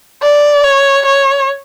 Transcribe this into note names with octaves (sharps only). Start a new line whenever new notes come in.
D5
C#5
C#5